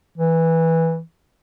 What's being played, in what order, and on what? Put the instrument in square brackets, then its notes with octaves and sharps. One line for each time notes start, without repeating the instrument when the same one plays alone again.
[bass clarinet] E3